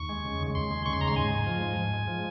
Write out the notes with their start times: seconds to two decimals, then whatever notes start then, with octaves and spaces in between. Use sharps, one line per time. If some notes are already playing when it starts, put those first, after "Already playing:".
Already playing: D#2 C#6
0.09 G#3
0.25 C#3
0.40 D#2
0.55 D#2 C6
0.71 G#3
0.86 C#3 C#6
0.93 C6
1.01 D#2 A#5
1.08 C6
1.16 G#2 G#5
1.32 G#3
1.47 F3
1.62 G#2
1.77 G#2
1.93 G#3
2.08 F3